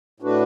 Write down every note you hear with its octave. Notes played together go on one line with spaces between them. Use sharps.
A2 A3 D4 F#4 B4